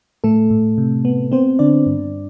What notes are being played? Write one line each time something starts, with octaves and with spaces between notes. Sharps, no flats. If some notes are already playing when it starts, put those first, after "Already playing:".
A2 A3 A4
A2
C3
B3
B3 C4 C5
D3 D4 D5
G2